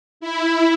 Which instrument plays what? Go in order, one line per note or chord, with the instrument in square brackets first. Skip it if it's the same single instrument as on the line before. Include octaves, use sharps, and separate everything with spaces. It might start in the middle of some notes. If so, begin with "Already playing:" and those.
[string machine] E4